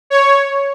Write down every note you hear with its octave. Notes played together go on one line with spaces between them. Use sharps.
C#5